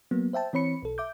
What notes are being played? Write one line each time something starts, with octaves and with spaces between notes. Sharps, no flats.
F#3 A#3 B3
C5 E5 G5 A5
E3 C4 C#5 B5 C#7
B1 A4
E5 D6 G6